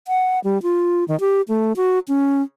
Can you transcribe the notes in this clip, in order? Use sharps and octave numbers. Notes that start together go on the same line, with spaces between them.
F#5
G3
F4
D#3
G4
A3
F#4
C#4